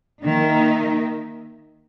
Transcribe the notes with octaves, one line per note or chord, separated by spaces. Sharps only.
D#3 A#3 D#4 A#4 E5